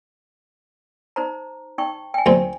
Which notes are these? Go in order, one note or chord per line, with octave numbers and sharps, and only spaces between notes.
D#4 C5 A#5
D#4 G5 C#6
G5 G#5
D2 C4